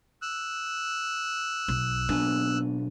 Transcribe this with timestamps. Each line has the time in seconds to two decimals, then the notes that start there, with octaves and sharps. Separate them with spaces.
0.22 E6 F#6
1.68 B1
2.09 B1 B3 D4 G#5